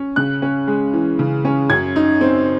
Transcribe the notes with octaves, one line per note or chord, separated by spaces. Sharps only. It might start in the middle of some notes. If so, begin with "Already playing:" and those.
Already playing: C#4
C#3 F#6
C#4
G#3
E3
C#3
C#4
F#2 G#6
D#4
C4